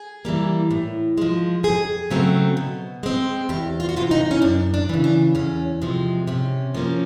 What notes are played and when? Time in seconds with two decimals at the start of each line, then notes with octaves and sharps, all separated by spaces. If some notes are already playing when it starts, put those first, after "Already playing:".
Already playing: G#4
0.25 E3 G3 A#3
0.71 A2
1.18 F3 G#3
1.63 F2 G#4
2.10 C#3 F#3 A3 C4
2.57 B2
3.03 G#3 C4
3.49 E2 G4
3.80 F4
3.89 F#4
3.96 C3 E3 F4
4.11 D#4
4.31 C#4
4.42 F#2 D4
4.74 D4
4.89 C#3 E3
5.04 D4
5.35 E2 C#4
5.82 C3 F3 G#3
6.27 C3 C#4
6.75 F3 A#3 C#4